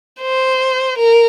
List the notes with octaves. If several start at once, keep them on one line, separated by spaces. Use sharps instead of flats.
C5
A#4